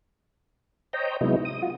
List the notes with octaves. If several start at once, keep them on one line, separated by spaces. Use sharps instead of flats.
C5 C#5 D#5 G5 A#5
C3 F#3 G#3 B3 D#4 E4
D#6
F4 F#4